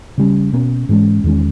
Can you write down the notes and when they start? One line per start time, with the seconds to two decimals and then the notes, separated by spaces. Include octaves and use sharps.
0.18 C#3 G3 C#4
0.53 B2 A#3 C#4
0.89 G#2 E3 G#3 C#4
1.24 E2 D#3 G#3 C#4